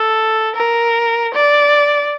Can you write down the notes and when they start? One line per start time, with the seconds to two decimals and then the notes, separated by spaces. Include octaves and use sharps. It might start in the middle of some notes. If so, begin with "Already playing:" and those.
Already playing: A4
0.56 A#4
1.34 D5